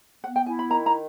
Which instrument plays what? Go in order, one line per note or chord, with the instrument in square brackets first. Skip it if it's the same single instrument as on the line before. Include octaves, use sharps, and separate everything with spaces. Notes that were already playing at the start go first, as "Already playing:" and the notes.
[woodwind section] B3 [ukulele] F#5
[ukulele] G5
[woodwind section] E4 [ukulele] G#5
[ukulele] B5
[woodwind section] D#3 [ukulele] A#5
[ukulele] A#5